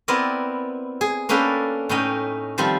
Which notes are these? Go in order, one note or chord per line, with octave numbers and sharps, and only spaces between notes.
B3 C4 E4 A#4 D5 D#5
G#4
A#3 C#4 D4 A4 B4 G5
A2 C#4 D#4 D#5 G5
D#3 F3 G3 C4 C5